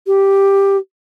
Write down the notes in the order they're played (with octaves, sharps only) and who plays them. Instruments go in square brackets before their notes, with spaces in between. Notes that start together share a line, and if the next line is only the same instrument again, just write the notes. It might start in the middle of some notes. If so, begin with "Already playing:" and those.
[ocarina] G4